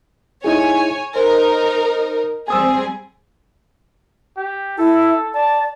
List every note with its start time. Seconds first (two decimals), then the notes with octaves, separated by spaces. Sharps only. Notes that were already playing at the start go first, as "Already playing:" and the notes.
0.44 D#4 E4 G#4 C#5 G#5
1.16 D#4 A#4 C5
2.48 G3 C4 G#4 G#5 D#6 E6
4.37 G4
4.78 E4 A4
5.34 D5 A5